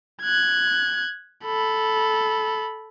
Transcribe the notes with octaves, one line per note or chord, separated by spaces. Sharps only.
F#6 G#6
A4 B5